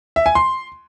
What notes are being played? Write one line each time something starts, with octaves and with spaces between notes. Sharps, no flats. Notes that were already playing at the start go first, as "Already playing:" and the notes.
E5
G#5
C6